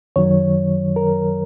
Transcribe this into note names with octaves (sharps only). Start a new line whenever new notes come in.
F#2 D#3 F#3 C#5
A#4